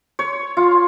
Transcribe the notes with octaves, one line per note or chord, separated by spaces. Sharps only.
C#5
F4